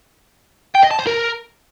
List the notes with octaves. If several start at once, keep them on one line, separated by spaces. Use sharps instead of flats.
G5
D#5
A5
C5
A#4